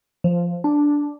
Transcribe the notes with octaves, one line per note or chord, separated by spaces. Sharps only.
F3
D4